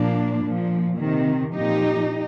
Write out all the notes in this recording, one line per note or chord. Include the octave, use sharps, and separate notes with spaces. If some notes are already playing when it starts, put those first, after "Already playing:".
Already playing: A#2 F3 A#3 D4
A#2 F3
C3 D#3
A#2 F3 D#4 G4